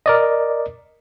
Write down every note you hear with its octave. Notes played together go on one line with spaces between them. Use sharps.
A#4 D5 D#5